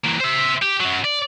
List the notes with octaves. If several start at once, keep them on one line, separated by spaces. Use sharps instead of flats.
E3 A#3
C5 E5
G4
F#2 F#3
D5